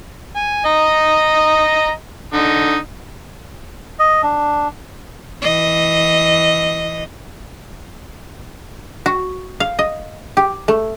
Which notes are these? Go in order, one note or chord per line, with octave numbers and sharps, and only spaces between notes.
G#5
D#5 A#5
D3 D#4
D#5
D4
E3 D#5
F#4
F5
D#5
G4
A3